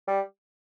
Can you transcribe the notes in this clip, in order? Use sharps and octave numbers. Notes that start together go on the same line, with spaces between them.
G3